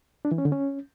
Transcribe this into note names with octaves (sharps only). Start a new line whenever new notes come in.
D4
E3
C#4
D3
C#4